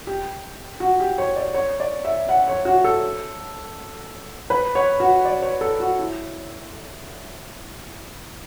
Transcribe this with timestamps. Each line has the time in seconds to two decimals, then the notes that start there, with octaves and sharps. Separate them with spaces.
0.07 G4
0.80 F#4
1.00 G4
1.18 C#5
1.36 D5
1.54 C#5
1.80 D5
2.05 E5
2.29 F#5
2.48 C#5
2.65 F#4
2.84 A4
4.50 B4
4.75 C#5
5.00 F#4
5.25 D5
5.43 C#5
5.61 A4
5.80 F#4
5.99 E4